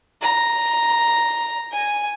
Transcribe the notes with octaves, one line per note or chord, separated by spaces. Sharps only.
A#5
G#5